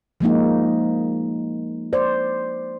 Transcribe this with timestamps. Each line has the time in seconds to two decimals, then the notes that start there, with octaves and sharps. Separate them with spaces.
0.21 F3 G#3 A#3 D#4
1.93 C5 D5